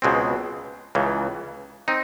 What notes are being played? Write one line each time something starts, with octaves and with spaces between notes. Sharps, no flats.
C#2 B2 G#3 C4
C#2 C#3 E3
C4 D#4